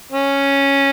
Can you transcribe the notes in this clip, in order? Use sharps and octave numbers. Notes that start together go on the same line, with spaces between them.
C#4